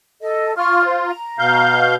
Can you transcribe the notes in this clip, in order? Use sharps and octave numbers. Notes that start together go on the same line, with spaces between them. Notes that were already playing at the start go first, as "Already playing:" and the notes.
A4 D#5
F4 C#6 F6
C5
A#5
B2 F5 G6